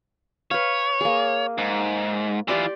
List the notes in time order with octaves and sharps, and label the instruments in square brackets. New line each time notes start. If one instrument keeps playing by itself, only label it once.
[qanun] B4 F5 [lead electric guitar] C#5
[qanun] A#3 G#4
[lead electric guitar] G#2
[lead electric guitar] E3 F4 [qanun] G4 D5 C6